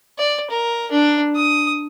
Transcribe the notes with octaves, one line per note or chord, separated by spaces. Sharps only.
D5
A#4
D4
D#6